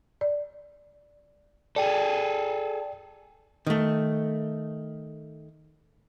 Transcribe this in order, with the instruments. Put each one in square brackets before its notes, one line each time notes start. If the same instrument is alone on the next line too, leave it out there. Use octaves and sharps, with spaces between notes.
[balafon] D5
[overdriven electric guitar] G#4 A4 [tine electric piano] D5 G5
[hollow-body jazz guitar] D#3 A3